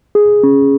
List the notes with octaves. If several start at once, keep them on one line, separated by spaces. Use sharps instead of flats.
G#4
C#4